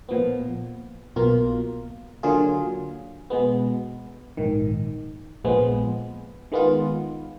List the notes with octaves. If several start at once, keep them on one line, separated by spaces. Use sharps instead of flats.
A#2 F3 B3
B1 B2 A#3 F4
D3 F#3 A#3 F4 G#4
B2 G#3 B3
A#1 G#2 D#3
A#1 A#2 F3 G#3 B3
D#3 G#3 B3 F4